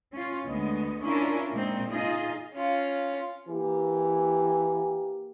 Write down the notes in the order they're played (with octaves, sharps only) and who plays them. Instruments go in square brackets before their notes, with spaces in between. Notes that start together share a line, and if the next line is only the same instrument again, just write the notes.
[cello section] C#4 F4
D2 G#3 B3 D#5
C#4 D4 E4 F4 A#4
A#2 G#3 C4 D#4
D#4 F4 G#4 D#5
[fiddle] C#4 F4
[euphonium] E3 [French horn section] A#3 G4